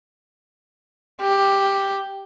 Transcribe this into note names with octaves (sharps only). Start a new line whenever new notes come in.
G4